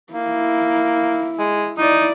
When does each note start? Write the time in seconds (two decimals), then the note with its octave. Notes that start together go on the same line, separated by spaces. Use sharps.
0.14 A#3 E4
1.38 G#3
1.78 D#4 E4 D5